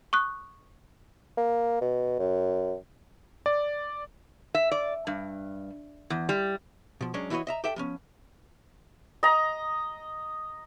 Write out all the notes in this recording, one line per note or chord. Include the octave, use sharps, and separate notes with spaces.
C#6 D#6 F#6
A#3
B2
F#2
D5
E5
D5
G2
E2
G3
B2 F3
F#3 G#3 C#4 D4
E3 E4 F#4 C5 C#5 D#5
D#5 E5 A#5
G4 A4 E5 G5
F3 B3 C#4
D#5 A#5